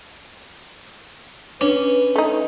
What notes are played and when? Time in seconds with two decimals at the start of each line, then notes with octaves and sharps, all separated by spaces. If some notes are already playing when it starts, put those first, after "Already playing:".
1.61 C#4 D4 B4
2.16 A3 D#4